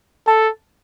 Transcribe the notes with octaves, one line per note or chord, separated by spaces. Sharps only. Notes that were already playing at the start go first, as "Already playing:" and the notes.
A4 A5